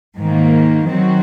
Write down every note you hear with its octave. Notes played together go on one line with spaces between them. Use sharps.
G#2 D#3 A#3
D#3 F#3 C4 F#4